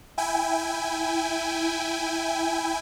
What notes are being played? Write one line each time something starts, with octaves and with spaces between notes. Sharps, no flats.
E4 G5 G#5